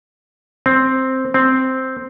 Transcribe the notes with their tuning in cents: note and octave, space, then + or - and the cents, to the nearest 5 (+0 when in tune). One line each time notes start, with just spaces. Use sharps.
C4 +0
C4 -5